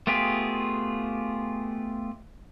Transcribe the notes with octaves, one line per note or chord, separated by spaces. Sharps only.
A3 B3 F4 G4 G#4